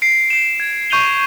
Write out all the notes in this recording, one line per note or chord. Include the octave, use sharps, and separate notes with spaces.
C7 D7
C7 E7
G#6
C#6 G6 D#7 F7 G7